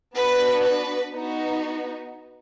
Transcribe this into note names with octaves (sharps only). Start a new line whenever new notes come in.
B3 D4 F#4 B4
B4
B3 D#4 F#4